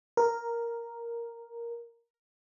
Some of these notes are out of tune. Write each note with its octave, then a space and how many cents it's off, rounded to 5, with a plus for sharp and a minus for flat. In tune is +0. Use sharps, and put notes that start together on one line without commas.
A#4 +0